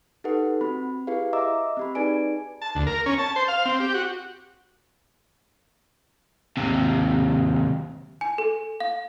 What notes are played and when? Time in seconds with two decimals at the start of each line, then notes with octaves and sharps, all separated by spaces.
0.24 D#4 G4 A4 B4 F#5
0.61 C4 F#4 B5
1.07 E4 G4 G#4 B4 F5
1.33 D#5 E5 A#5 D6 E6
1.77 C4 G4 B5
1.95 D#4 G#4 B4 D5 G#5 D7
2.62 A5
2.75 D2
2.87 A#4
3.06 C#4
3.19 A5
3.36 C5
3.48 F5
3.65 C4
3.80 G4
3.94 F#4
6.57 D#2 C3
8.21 G#5
8.38 A4
8.80 F5